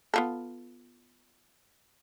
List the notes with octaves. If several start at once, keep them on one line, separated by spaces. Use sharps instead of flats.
B3 F4 A4